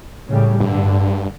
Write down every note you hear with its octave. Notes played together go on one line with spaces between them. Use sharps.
A2 C#3 G3
G2 D3